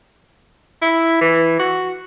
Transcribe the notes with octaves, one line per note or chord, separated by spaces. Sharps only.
E4
E3
F#4